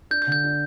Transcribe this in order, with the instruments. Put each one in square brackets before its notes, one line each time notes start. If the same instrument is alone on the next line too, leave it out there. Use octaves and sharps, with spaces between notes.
[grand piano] D4 [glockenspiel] G6
[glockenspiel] G6
[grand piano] D3
[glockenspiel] G6
[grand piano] D4